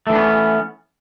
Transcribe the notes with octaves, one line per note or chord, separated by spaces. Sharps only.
E3 A3 B3 C#4 D4